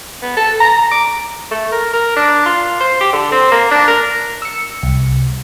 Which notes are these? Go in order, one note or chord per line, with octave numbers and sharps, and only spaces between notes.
B3
A4
A#5
D6
A3
A#4
A#4
D4
F4
C5
G4
D3
C4
A#3
D4
A#4
E6 C#7
C2